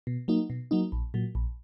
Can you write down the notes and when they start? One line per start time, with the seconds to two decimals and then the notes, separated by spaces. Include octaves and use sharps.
0.07 B2
0.28 F#3 A#3 D#4
0.50 B2
0.71 F#3 A#3 D#4
0.92 A#1
1.14 A#2 F#3
1.35 A#1